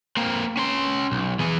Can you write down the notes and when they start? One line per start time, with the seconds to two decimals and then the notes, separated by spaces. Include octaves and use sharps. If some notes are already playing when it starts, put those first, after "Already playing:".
0.17 A#3 C4
0.57 C#4 C6
1.12 B1
1.40 E3 G#4